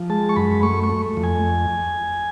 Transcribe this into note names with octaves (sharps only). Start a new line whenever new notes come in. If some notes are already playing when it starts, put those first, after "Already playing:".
Already playing: F3
G#3 A5
C#6
F#2 B5
A3 C#6
C#6
A3
F2
G#5